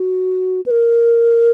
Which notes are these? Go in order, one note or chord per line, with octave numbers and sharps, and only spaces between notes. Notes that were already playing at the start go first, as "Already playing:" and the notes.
Already playing: F#4
B4
A#4